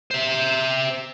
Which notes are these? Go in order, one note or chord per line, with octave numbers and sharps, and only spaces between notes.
C5 E5